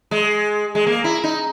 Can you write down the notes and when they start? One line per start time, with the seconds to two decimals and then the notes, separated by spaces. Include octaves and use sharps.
0.11 G#3
0.75 G#3
0.86 A#3
1.04 E4
1.24 D#4